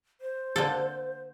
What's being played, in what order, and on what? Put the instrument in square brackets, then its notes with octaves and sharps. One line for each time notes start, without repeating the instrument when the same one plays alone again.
[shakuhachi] C5
[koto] D3 A#3 A4